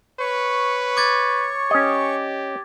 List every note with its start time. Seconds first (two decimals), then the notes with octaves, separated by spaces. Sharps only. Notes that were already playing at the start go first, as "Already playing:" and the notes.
0.20 B4 C#5 C#6
0.97 D6 G#6 A6
1.71 C#4 G4 D#5